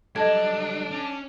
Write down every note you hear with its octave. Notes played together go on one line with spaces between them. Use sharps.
F#3 G3 D4 A4 D#5 A5 G#6
C#4